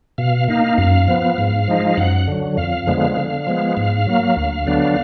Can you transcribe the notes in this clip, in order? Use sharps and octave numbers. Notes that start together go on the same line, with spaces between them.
B2 F5
A#3 D#4 F5
F#2 F5
F3 B3
G#2
F3 G#3 D#4
F#2 F#5
D3 F#3
F2 F5
D3 F3 G#3 B3
D3
F3 G#3 B3
G#2 F5
F#3 A#3
D2
D3 F#3 B3 D4